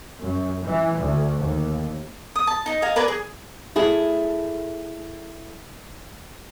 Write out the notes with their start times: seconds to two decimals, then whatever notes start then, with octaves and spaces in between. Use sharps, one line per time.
0.22 F#2
0.65 E3
0.99 D2
1.38 D#2
2.36 D#6
2.47 A5
2.66 D#4 D#5
2.82 D#5 F5 G#5 A#5
2.96 A#4 B4 D5 G#5
3.08 G#4
3.76 A3 E4 G#4